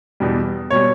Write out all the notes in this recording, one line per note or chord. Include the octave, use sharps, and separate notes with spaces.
E2 B2 G3
B2 G3 C#5